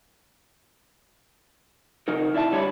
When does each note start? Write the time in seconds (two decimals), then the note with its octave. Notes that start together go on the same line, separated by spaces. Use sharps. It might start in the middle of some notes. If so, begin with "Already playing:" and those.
2.08 C#3 F#3 D#4 A#4
2.34 E4 D5 E5 A5
2.52 D3 G3 C#5 A5 B5